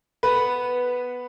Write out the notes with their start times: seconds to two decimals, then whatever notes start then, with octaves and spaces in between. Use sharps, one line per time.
0.23 B3 B4